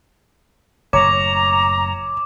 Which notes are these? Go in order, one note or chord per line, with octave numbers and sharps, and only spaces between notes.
F#1 A2 C#5 A#5 D6